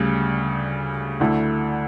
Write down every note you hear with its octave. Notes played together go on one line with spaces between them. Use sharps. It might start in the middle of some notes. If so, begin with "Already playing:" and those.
Already playing: D2 C#3 G3
D2 D3 A3 E4